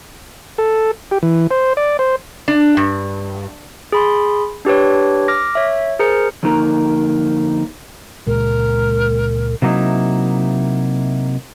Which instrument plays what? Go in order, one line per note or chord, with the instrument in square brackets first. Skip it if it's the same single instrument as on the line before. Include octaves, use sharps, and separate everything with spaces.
[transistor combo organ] A4
G4
E3
C5
D5
C5
[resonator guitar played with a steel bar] D4
G2
[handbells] G#4 B5 C6
D4 G4 B4 C#5
D6 F6 A#6
C#5 E5
G#4 A#4 C5 A#5 C#7
[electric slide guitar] F2 D3 A#3 D#4 A#4 A#5
[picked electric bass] C#2 A#2 G#3 [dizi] A#4
[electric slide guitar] C3 F#3 A#3 D#4 E4